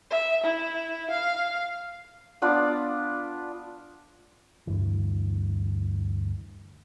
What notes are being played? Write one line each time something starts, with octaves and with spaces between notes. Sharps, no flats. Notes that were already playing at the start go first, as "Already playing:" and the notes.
E5
E4
F5
B3 D4 F4 D5
D2 G2 E3